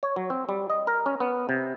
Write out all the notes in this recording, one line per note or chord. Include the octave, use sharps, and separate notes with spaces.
C#5
F#3
C4
G3
D#5
A#4
C#4
B3
C3